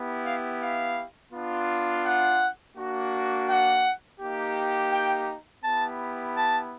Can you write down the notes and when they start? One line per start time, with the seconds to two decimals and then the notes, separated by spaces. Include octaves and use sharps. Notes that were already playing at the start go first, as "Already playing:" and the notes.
Already playing: B3 E4 G4
0.25 F5
0.61 F5
1.33 B3 D4 F4
2.05 F#5
2.77 A#3 D4 F#4
3.48 F#5
4.20 A#3 D#4 G4
4.92 G5
5.64 B3 E4 G4 A5
6.36 A5